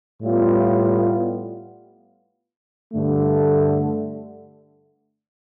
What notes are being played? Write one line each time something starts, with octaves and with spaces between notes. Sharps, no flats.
A2 G3 B3 F4
G2 D3 A3